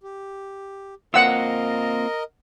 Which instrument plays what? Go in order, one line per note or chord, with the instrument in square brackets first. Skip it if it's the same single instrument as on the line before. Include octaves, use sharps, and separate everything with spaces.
[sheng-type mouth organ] G4
[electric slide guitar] A#3 C4 F4 [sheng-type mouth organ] A#4 D#5 [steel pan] F#5 E6